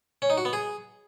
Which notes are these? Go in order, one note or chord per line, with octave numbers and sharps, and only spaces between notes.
C#4
D#4
F#4
B3
G#4